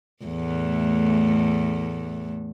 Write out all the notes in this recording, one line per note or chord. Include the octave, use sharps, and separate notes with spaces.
E2 A2 A3